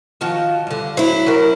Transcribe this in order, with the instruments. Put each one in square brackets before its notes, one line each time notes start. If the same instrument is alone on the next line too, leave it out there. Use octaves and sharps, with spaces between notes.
[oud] D#3 F3 F#4
G2 D3
[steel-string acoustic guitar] F#3 E4 [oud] C5
[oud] C#4 F#4 A#4